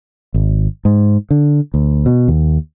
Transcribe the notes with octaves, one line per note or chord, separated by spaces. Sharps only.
G#1
G#2
D3
D2
B2
D#2